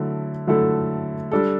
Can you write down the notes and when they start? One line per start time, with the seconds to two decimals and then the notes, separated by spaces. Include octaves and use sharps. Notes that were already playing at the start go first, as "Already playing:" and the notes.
Already playing: D3 F#3 A3 E4 A4
0.47 D3 F#3 A3 E4 A4
1.32 G3 D4 A4